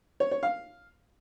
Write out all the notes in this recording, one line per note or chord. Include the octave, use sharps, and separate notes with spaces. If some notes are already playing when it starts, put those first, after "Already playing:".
C#5
C#5
F5